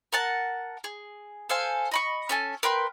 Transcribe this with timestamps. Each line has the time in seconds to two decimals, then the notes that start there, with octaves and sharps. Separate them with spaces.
0.13 A#4 F#5 A5
0.84 G#4
1.49 A4 C5 F5 G#5
1.91 D#5 B5 C#6
2.29 C#4 A4 G#5
2.63 A#4 B4 G5 C6